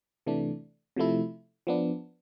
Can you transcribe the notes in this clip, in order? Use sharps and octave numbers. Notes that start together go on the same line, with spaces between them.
C3 E3 A3 D4
C3 F3 A3 E4
F3 B3 D4